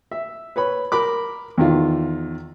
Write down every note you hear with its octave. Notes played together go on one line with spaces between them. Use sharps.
E5
B4 C#5 B5
A#4 B5 D6
E2 D#3 F4